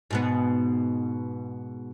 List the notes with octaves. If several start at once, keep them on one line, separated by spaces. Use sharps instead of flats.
G#2 B2 B3